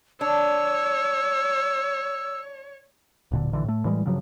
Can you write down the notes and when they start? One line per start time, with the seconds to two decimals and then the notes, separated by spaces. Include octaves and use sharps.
0.21 D4 C#5 E6
3.31 D1 A#2 D3
3.51 A#1 D3 E3
3.64 A2 A3
3.85 A2 E3 G3 G#3
4.06 G2 C#3 F3 F#3